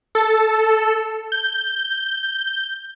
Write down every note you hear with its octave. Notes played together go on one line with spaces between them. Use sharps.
A4
G6